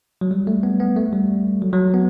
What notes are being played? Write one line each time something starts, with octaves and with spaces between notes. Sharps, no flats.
F#3
G3
A3
B3
B3
A3
G3
F#3
F#3
B3